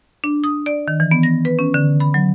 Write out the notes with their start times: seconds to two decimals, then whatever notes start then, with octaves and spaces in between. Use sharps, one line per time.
0.24 D4
0.44 D#6
0.66 D5
0.88 D#3
1.00 E3
1.11 B3
1.23 A#6
1.45 B4
1.59 C#4
1.74 D3
2.00 B5
2.14 F#3